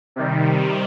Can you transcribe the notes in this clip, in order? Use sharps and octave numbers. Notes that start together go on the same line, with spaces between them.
C3 D#3 G3